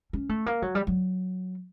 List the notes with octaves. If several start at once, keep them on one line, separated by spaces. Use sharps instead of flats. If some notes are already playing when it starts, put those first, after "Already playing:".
C#4
A3
A#3
F#3
G3
F#3